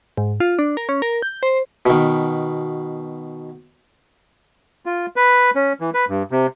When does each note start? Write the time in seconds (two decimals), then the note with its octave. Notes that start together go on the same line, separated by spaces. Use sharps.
0.17 G#2
0.40 F4
0.59 D4
0.77 A#4
0.89 C#4
1.02 A#4
1.22 G6
1.43 C5
1.86 B2 D#3
4.86 F4
5.16 B4
5.55 C#4
5.80 E3
5.94 B4
6.09 G2
6.31 C3